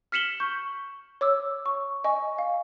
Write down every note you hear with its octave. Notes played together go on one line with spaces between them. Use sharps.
F6 B6 C#7 E7 F#7 G7
C#6 G6
C#5 D6 E6
C#6
D#5 G#5 C#6
F5